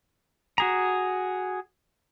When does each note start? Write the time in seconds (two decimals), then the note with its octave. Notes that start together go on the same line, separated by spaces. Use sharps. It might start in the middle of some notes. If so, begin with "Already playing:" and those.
0.58 F#4 G#4 A#5